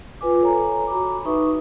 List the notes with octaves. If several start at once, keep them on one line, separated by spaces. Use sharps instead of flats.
F4 B4 G#5 D6
A4 C#5 G#5 A#5
F#4 A#5 B5 D6
D#4 B4 E5 C#6 D#6